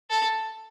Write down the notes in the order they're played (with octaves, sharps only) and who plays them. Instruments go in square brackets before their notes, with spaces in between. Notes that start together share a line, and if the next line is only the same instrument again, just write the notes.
[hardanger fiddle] A4